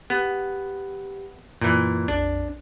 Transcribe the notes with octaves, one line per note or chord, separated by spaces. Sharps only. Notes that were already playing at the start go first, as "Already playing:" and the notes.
B3 G4
F#2 A#2 E3
A#1 F2 D4